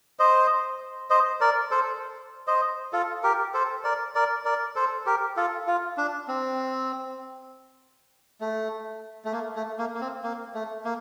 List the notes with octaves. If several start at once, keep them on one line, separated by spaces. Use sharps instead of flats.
C5 D#5
C5 D#5
A#4 D5
A4 C5
C5 D#5
F4 A4
G4 A#4
A4 C5
A#4 D5
A#4 D5
A#4 D5
A4 C5
G4 A#4
F4 A4
F4
D4
C4
A3
A3
A#3
A3
A#3
A#3
C4
A#3
A3
A#3